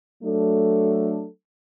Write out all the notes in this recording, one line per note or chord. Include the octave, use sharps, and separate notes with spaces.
F#3 A3 D4 A4